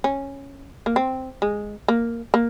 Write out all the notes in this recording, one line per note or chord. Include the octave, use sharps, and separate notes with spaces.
C#4
A#3
C4
G#3
A#3
A#3